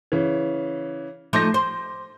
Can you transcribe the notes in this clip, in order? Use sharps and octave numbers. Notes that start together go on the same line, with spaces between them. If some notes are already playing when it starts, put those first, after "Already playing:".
C#3 E3
F3 A3 D#4 D6 G6 A#6
C5